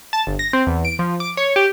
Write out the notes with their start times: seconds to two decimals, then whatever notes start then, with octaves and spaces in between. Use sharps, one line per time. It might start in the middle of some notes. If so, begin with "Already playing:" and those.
0.13 A5
0.27 G1
0.39 A#6
0.53 C4
0.67 E2
0.85 D7
0.99 F3
1.20 D6
1.37 C#5
1.56 G4